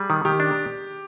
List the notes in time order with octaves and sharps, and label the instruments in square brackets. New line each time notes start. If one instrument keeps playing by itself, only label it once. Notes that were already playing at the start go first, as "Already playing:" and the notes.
Already playing: [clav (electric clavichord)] G3 [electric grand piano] G#4
[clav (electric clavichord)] D#3
[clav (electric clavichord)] D#3 [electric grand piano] G4
[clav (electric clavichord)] D4